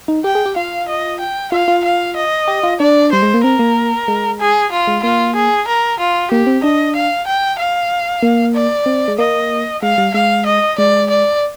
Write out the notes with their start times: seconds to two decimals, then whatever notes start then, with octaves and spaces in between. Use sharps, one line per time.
0.08 D#4
0.24 G4 G5
0.35 G#4
0.46 G4
0.56 F4 F5
0.88 D#5
1.20 G5
1.52 F4 F5
1.68 F4
1.84 F5
2.16 D#5
2.48 G4
2.63 F4
2.80 D4 D5
3.12 G3 C5
3.23 G#3
3.34 A#3
3.44 C4 A#4
3.59 A#3
4.08 G#3
4.40 G#4
4.72 F4
4.87 G#3
5.03 A#3 F4
5.35 G#4
5.68 A#4
5.99 F4
6.31 A#3 G4
6.47 C4
6.63 D4 D#5
6.95 F5
7.27 G5
7.59 F5
8.23 A#3
8.54 D5
8.86 C4
9.08 G#3
9.18 A#3 D#5
9.82 G#3 F5
9.98 G3
10.14 G#3 F5
10.46 D#5
10.78 G#3 D5
11.10 D5